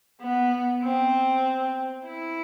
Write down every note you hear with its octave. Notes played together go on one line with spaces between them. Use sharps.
B3
C4
E4